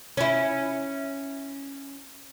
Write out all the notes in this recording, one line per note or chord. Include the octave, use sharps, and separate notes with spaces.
C#4 E4